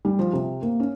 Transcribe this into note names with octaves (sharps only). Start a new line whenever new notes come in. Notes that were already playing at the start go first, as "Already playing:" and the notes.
G3
F3
C3
A#3
C#4